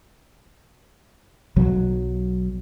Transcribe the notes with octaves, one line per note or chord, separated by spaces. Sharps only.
B1 F#3